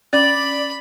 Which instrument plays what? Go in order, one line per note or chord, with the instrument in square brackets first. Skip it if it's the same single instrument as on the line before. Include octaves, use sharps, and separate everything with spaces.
[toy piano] C#4 [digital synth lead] D5 [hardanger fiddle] B5 [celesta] A6